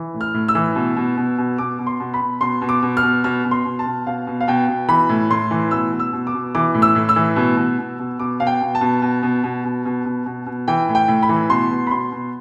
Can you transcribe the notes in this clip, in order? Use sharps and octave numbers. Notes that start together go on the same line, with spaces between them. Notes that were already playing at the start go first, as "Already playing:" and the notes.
Already playing: E3
A2
F6
A2
E6
E3
B2
B2
B2
B2
B2 D6
B2
C6
B2
B5
B2
B2 C6
B2
D6
B2
F6
B2
B2 F6
B2
C6
B2
A5
B2
B2 F5
B2
F5
B2 G5
B2
E3 B5
A2
A2 C6
E3
B2 E6
B2
E6
B2
D6
B2
E3 D6
A2
E6
A2
E6
E3
B2
B2
B2
B2
B2 D6
B2 F5
G5
B2
A5
B2
B2
B2
B2
B2
B2
B2
B2
B2
E3 G5
A2
G5
A2
B5
E3
B2 C6
B2
B5
B2 C6
B2